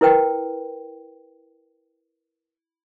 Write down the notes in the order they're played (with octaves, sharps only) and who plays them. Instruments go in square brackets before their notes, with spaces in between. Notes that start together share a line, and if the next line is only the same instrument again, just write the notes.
[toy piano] E4 A#4 B4 G5